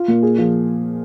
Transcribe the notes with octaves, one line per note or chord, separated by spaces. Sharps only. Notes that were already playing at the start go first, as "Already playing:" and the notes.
Already playing: F4
A#2
G#4
F3